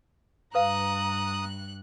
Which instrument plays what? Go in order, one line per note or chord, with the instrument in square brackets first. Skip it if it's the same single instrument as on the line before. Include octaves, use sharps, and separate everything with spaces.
[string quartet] G2 F#6 [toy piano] B4 F5 [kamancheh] A#5 [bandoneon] D#6